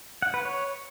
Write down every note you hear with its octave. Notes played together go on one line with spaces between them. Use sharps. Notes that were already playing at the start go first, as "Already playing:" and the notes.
F#5
B4
C#5